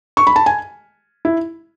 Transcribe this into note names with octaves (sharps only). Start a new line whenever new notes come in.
C#6
B5
A5
G#5
E4